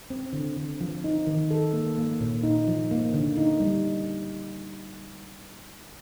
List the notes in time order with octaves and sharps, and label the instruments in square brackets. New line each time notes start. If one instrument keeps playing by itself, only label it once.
[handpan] C4
D3
D3
F3
D#4
D#3
A4
A#3
A#3
A#2
D#4
F3
A#3
D3
D#4
G3